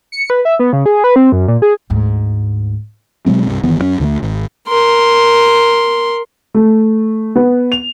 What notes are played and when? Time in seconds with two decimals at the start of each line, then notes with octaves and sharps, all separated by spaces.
0.12 C#7
0.30 B4
0.45 E5
0.60 B3
0.73 C#3
0.86 G#4
1.04 B4
1.16 C4
1.32 F#2
1.48 A#2
1.62 G#4
1.90 D2 G#2
3.26 B2 F#3 G#3 C4
3.48 C2 G2
3.63 G1 D#3 E3 B3
3.78 F#2 D#3 C#4
4.00 D2 D3 D#3 A3
4.23 G#1
4.68 A#4 C6
6.54 A3
7.36 B3
7.72 F7